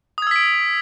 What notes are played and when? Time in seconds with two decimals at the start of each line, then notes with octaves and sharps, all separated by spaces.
0.18 D#6
0.22 G#6
0.27 E6
0.31 B6
0.36 D7